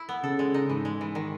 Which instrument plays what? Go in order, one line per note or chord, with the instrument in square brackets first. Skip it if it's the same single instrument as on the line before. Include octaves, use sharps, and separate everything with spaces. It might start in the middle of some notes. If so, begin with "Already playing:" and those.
Already playing: [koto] E4
B3
[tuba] C#3 [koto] A4
[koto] G#3
D#4
[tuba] G#2 [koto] E3
[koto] G#3
E3
D#3